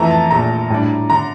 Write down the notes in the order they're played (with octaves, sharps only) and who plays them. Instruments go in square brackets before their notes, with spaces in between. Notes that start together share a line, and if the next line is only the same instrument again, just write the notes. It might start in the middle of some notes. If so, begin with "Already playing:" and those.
Already playing: [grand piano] F2 E3 A3 E4 [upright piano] A#5
[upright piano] A5
[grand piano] A#1 A#2 A3 [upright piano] A#5
[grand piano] A2 G3 D4
[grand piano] D3 [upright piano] A#5